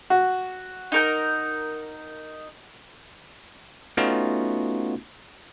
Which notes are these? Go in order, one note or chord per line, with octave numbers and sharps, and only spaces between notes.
F#4
D#4 A#4 G6
A3 B3 C#4 D#4 F4 F#4